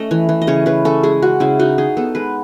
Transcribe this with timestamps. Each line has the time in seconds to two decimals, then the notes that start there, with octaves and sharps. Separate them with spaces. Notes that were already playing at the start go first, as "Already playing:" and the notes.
Already playing: A3 C#4 D#5 A5
0.11 E3
0.29 E3
0.42 D#5
0.47 C#3 C#5
0.66 C#3 B4
0.85 C#4 A4
1.03 G#3 G#4
1.22 C#4 F#4
1.40 C#3 E4
1.59 D#4 F#4
1.78 D#4 G#4
1.97 B3 A4
2.15 G#3 B4